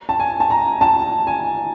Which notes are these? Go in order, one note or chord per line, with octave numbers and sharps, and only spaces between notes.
A5
G#5
A5
A#5
A5
G#5